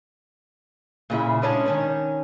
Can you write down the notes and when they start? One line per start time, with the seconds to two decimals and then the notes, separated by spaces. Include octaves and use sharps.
1.10 A#2 C#3 E4
1.42 G#3 C#4 D4
1.66 D#3 C#4 D4